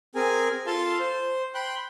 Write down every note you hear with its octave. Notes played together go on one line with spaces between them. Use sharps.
C4 G#4 A#4 G#5
F4 A4 F5 A5 C6
C5
G5 B5 C6 F#6